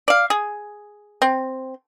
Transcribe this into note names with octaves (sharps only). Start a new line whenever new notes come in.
D5 F5
G#4
C4